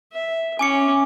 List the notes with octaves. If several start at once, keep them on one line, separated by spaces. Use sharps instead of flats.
E5
C#4 G#5 D6 C#7